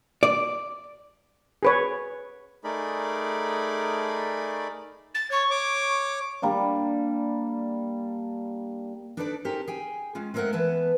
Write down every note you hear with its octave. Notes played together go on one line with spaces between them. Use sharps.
D5
G#4 B4 C#5
A3 D#4 G#4 A#4 D5 B5
A6
C#5 C#6
C#5 D6
G3 A#3 D4
D4 D#4 A4 B4 C#5 D5
C#4 D#4 G4 A4 A#4 C5
G#4 G5 G#5
G#3 C#4 F4
G#3 A3 C4 A#4 F5 F#5
E3 B3 B4 A5